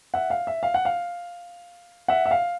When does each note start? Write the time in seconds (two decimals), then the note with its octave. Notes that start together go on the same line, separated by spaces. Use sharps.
0.14 E5 F#5
0.30 F5
0.47 E5
0.63 F5
0.74 F#5
0.85 F5
2.08 E5 F#5
2.26 E5
2.31 F5